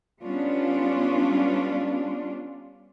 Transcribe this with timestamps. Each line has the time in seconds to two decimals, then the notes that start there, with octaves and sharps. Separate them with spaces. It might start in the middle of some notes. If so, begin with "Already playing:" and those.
0.21 G3 B3 C#4 D4 F4